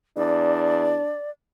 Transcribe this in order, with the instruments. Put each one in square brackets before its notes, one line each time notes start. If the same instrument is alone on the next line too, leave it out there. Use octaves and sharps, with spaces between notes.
[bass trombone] E2 [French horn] D4 [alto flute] D5